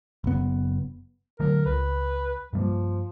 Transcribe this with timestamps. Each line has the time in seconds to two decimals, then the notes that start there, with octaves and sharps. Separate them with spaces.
0.24 F#1 B3
1.40 D3 F#3 A3 A#4
1.66 C#2 B4
2.53 G2 F3 G3 A#3